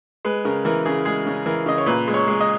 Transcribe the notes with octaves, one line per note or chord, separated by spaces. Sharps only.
G#3 B4
C#3 A#4
E3 A#4
C#3 G#4
G#3 G#4
C#3
E3 A#4
C#3 D#5
C#5
A#2 B4
G#3
C#5
G#3
D#5